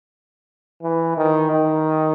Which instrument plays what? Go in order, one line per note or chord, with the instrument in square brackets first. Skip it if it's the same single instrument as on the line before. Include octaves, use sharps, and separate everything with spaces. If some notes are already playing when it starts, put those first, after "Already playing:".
[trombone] E3
D#3
D#3